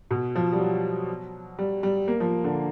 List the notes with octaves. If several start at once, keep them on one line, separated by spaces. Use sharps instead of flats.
B2
F3
G3
F#3
G3
G3
A#3
F3
D3